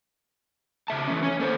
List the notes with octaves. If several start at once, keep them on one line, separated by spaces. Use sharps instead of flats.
C#3 E5 A5
E3 G3 C#4
C#4 C#5
A#3 A4 C5